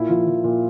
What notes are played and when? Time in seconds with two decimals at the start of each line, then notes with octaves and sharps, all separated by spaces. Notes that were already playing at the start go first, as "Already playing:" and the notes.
Already playing: A#2 E4
0.09 F3
0.27 F3
0.44 A#2